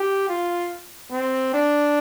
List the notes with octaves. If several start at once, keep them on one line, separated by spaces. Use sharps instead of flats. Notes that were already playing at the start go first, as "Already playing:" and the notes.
Already playing: G4
F4
C4
D4